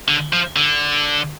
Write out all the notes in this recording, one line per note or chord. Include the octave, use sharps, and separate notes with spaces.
D3
F3
D3